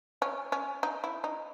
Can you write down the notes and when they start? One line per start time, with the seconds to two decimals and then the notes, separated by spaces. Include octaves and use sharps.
0.22 C#4
0.52 C#4
0.83 D#4
1.04 E4
1.24 D#4